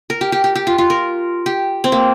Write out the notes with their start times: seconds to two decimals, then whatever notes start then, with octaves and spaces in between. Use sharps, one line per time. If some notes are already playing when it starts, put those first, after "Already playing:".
0.10 A#4
0.21 G4
0.32 G4
0.44 G4
0.55 G4
0.67 F4
0.78 F4
0.90 A#4
1.46 G4
1.84 C4
1.92 A#3